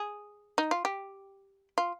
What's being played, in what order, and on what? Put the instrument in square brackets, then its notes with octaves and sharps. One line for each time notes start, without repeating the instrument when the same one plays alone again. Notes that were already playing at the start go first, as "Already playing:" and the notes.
Already playing: [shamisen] G#4
D#4
F4
G4
F4